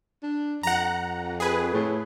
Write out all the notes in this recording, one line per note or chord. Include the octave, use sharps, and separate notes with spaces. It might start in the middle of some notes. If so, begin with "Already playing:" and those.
D4
F2 F#5 A#5
G#4 B4
A2